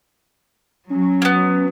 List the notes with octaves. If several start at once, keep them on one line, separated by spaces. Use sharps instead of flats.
F#3 C#4
A#3 B3